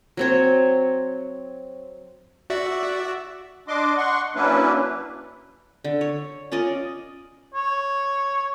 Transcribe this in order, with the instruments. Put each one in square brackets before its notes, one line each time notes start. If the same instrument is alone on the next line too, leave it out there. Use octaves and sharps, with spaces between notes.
[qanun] F#3 C4 C#5
[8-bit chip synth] F#4 D5 E5
[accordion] D4 D#5 C6 D6
F#5 C6 C#6
F#3 A#3 C#4 D4 E4 B4
[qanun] D3
C#5
C#4 F4 D5 D#5
[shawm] C#5